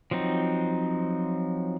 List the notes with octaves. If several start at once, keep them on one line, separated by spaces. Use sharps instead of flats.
F3 F#3 C4 D#4